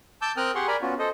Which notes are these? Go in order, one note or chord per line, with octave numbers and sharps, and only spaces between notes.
A5 D6 E6 G6
C4 A#4 G5 D#6 F6 F#6
G4 G#4 F#5 C6 C#6
A#4 D5 G#5 A#5 B5
B3 C#4 F4 F#4
A4 C5 D#5